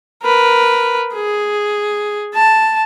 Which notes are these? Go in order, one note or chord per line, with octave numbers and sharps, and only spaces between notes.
A#4 B4
G#4
A5